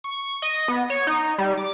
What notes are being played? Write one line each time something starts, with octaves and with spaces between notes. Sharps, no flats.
C#6
D#5
B3
C#5
D#4
G3
D6